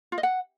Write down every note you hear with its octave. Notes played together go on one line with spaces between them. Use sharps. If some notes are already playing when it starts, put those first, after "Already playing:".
F4
D#5
F#5